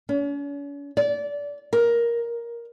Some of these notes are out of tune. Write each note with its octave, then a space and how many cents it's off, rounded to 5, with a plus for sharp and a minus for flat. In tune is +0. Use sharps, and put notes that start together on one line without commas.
C#4 +45
D5 -20
A#4 +10